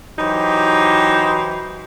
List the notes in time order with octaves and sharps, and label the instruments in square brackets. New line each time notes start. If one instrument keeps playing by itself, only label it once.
[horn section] E3 F#3 D#4 G4 C5